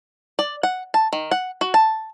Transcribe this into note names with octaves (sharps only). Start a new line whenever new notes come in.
D5
F#5
A5
D#3
F#5
F#4
A5